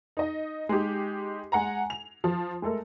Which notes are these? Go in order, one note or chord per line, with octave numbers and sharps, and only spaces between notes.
D#4 D#5
G#3 D#4 G4
G#3 F#5 G#5 A#5
F7
F3
G#3 A3 A4 A#4